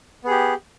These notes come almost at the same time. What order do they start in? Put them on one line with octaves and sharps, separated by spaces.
B3 G#4 G4